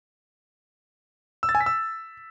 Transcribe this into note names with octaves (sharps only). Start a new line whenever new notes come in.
E6
A6
G#5
B6
E6